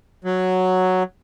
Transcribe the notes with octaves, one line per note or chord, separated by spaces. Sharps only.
F#3